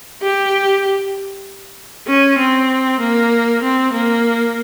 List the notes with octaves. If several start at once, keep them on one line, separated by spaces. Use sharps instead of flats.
G4
C#4
C4
A#3
C4
A#3